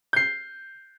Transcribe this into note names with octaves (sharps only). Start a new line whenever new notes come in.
G6 C7